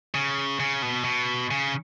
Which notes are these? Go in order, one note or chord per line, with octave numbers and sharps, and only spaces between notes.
C#3
C#3
B2
B2
C#3